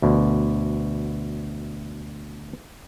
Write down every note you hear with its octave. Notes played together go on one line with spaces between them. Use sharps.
D2 B2